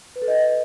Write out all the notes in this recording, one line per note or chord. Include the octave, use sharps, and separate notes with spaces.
B4
A4
D#5